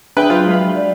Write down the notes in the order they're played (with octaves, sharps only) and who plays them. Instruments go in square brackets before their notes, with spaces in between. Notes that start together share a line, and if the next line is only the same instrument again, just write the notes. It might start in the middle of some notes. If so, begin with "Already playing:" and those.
[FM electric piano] D4 E5 [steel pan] G#4 [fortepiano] B4 G5
[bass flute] F#3 [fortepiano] F4 [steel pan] C5
[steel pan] G#3 F5 B5
[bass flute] D5